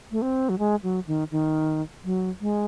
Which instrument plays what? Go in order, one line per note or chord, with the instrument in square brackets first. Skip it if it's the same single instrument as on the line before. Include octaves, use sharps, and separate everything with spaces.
[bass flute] A3
C4
F#3
G#3
F#3
D#3
D#3
F#3
G#3